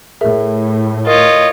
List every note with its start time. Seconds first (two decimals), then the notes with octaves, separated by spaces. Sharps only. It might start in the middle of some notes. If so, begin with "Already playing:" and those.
0.21 A2 G#4 A#4 E5
1.07 F4 A#4 C#5 D#5